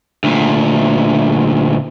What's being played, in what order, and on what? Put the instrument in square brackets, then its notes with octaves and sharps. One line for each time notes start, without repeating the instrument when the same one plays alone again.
[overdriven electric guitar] D2 A#2